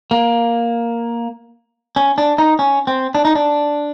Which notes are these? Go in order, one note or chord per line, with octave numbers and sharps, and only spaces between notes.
A#3
C#4
D4
D#4
C#4
C4
D4
D#4
D4